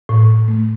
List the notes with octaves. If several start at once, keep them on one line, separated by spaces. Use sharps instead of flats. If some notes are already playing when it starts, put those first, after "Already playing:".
A2
A3